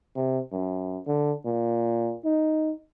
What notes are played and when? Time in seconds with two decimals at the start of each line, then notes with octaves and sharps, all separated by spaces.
0.15 C3
0.52 F#2
1.07 D3
1.45 A#2
2.25 D#4